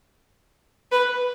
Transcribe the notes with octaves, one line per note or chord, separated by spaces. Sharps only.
B4